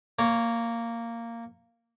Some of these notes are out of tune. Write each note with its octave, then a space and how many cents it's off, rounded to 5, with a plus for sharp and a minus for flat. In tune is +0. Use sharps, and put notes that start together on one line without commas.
A#3 -10 C#5 +0